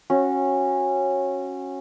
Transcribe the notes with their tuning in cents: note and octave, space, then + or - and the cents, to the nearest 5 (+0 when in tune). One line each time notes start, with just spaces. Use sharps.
C#4 -20 F#4 -10